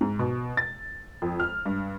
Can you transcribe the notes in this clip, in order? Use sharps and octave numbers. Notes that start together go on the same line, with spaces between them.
G#2
B2
A6
F2
F6
G2